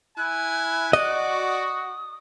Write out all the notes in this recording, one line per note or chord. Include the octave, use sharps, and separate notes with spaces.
E4 G#5 F#6
F#4 D5 D#5
D#6